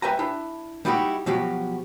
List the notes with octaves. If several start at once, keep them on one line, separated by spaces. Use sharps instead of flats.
G3 B4 E5 G5 G#5 A#5
D4 E4
G3 D#4 E4 F#4 G4
B2 F3 F#3 F#4 G4